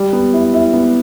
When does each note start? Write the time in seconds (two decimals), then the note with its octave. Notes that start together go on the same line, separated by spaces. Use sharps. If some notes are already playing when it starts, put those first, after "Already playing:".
Already playing: G3
0.13 B3
0.33 E4
0.53 E4
0.74 B3